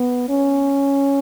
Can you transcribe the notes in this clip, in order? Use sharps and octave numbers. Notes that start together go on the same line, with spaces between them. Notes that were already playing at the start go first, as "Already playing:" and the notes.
Already playing: B3
C#4